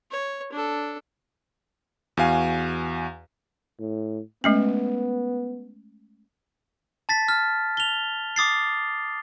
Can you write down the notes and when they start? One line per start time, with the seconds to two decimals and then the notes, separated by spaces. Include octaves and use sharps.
0.11 C#5
0.52 D4 A4
2.17 E2 F#4 F5 G#5
3.80 A2
4.44 G#3 A3 B3 C#4
7.09 A5 A6 B6
7.28 F6
7.77 F7 G7
8.36 D6 D#6 A6 C7